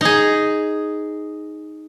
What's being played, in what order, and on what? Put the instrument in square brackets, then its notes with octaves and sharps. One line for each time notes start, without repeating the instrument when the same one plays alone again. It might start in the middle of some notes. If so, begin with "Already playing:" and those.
[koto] D#4 G#4